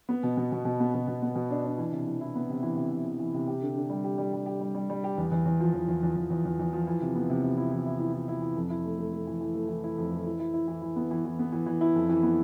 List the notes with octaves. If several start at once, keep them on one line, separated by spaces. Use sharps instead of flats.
B3
B2
B2
B2
B2
B3
B2
B2
B3
B2
D4
D4
E3
C3
E3
E4
B3
C3
E3
C3
C3
E3
E3
C3
G4
D3
D3
G3
G4
G3
G3
G4
G3
G3
G3
G4
E2
E2
E2
F3
E2
E2
E2
E2
E2
E2
E2
F3
E3
C3
B3
C3
C3
E4
E3
E4
E4
E4
E4
E3
F2
E4
A3
A3
A3
E3
E3
A3
E3
E4
F2
E3
E4
E4
E4
E3
E3
B3
E3
E3
B3
E3
E3
E4
F2
E3
B3